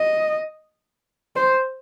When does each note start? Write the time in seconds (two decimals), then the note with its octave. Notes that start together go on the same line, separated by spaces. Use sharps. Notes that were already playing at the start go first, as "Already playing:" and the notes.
Already playing: D#5
1.36 C5